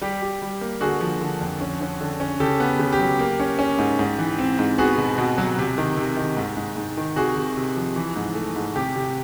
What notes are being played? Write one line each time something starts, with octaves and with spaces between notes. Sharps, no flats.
G3 G4
G3
G3
A#3
D3 F#4 G#4
F3
D3
F2
C#4
C#4
D3
C#4
C#3 G4 A4
B3
C#3
G4
F#3
A#3
C#4
C#4
G#2
G#2
E3
C4
G#2
B3 F#4 G#4
B2
B2
F#3
C3
D#3
C3
D#3
G#2
G#2
G#2
D#3
C3 F#4 G#4
C3
C3
F3
E3
G#2
A3
G#2
C3 G4
C3